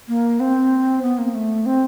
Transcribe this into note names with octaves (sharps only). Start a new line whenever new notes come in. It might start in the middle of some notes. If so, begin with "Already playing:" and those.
A#3
C4
B3
A#3
A3
C4